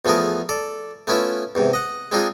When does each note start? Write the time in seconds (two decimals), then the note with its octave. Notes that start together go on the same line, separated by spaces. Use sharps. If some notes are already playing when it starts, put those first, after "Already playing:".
0.05 E2 F3 A3 B3 G#4 A#4
0.49 A4 D5
1.07 A3 B3 C#4 E4 F4 E5
1.55 E2 G#2 C3
1.73 D#5 F#5
2.12 G#3 C4 D4 D#4 F4 G#4